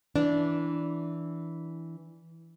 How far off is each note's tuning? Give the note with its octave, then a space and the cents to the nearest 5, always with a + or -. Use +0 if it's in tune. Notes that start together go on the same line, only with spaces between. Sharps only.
E3 -5 D4 -15